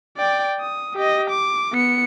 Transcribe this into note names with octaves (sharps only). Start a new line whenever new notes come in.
D5 G5
D#6
G4 D#5
D6
B3 C#7